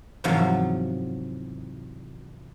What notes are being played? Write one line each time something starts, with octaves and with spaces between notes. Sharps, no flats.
E2 G#2 C3 F3 F#3 F5